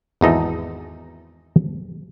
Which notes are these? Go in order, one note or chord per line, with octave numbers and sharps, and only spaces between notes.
G#1 E2 D#4 A4